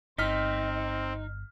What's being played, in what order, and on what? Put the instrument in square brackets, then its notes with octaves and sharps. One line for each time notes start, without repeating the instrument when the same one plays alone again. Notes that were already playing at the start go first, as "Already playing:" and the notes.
[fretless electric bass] G1 [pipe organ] C4 [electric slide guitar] D#4 [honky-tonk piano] F6 B6